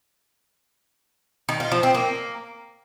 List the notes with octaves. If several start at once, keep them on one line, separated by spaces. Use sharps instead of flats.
D#3
F4
F3
C4
A#3